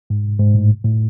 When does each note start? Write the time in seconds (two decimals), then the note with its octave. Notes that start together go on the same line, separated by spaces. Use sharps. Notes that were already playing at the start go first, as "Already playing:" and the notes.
0.10 G#2
0.40 G#2
0.55 A2
0.84 A2